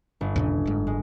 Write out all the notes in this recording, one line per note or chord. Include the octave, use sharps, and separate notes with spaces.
G1
D#2 A#2 C#3
F#1 G#2
G#3